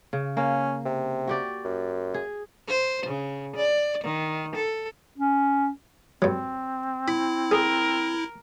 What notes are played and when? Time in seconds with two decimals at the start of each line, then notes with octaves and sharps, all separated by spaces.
0.13 C#3
0.37 A#3 C#4
0.85 C3
1.28 F#4 G4 D5
1.65 F#2
2.14 G#4
2.68 C5
3.06 C#3
3.56 D5
4.04 D#3
4.55 A4
5.18 C#4
6.22 G2 F#3 C4
7.08 E4 B5
7.51 G#4 A#4